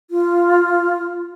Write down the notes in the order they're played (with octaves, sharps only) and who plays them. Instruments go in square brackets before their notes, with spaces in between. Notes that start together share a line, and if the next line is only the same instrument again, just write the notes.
[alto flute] F4